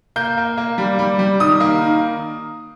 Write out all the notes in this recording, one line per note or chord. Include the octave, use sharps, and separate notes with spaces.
A#3 G6
A#3
A#3
G3
G3
G3
D#3 D#6
A#3
D#3